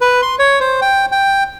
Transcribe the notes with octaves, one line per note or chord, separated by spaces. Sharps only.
B4
C6
C#5
C5
G5
G5